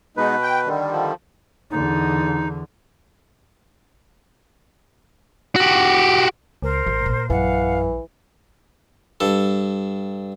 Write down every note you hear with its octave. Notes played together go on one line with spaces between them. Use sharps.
B2 G#3 B3 D#4 B4
G5
D3 D#3 G3
F3
E2 D3 D#4
F#4 G4
C#2 A#4 C5
A1 A2
A#2
A#1 F#2 E3 F5 F#5
G2 A4